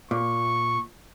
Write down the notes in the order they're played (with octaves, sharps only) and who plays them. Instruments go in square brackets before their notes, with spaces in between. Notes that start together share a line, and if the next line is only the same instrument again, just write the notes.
[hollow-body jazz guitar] A#2 [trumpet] C#6